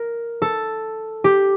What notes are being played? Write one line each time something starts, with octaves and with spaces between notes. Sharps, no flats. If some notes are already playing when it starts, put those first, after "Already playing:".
Already playing: A#4
A4
G4